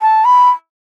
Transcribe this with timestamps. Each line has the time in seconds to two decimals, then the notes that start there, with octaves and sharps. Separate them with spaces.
0.02 A5
0.25 B5